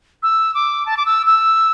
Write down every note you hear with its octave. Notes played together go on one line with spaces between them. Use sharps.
E6
D6
A5
D6
E6
E6